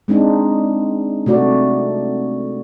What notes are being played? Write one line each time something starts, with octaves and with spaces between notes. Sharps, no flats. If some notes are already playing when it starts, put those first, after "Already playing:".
G#3 C4 D4 D#4
C3 A3 F#4 D5